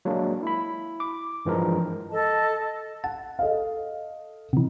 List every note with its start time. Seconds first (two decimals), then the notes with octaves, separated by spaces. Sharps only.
0.05 F#3 G#3 A#3 D4
0.43 E4 B5
1.00 D6
1.45 G2 E3 F3 G#3 D4 A#4
2.10 A4 D#5 A5
3.04 F#5 A5
3.39 A4 D#5 F5
4.53 C3 E3